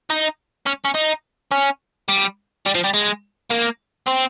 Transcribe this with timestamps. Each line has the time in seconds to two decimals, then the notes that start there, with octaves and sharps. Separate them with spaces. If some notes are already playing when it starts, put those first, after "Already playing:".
0.10 D#4
0.67 C#4
0.85 C#4
0.95 D#4
1.51 C#4
2.08 G3
2.66 G3
2.75 F3
2.84 G3
2.94 G#3
3.51 A#3
4.08 C4